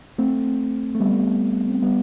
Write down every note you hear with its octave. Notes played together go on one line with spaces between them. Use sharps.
A3 C4
A3
G3 B3
C4
G3 B3